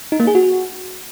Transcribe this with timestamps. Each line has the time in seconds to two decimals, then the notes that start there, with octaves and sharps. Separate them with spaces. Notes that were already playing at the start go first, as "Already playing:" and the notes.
0.12 D#4
0.20 A#3
0.27 G#4
0.35 F#4